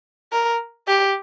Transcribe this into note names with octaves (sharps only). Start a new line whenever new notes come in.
A#4
G4